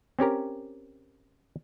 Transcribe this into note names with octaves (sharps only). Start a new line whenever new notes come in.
C4 C#4 G4 A#4